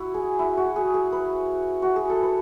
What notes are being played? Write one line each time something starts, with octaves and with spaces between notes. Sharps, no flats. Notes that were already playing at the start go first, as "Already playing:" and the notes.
Already playing: E4 F#4
G#4
E4
F#4
G#4
G#4
B4
F#4
G#4
A4
B4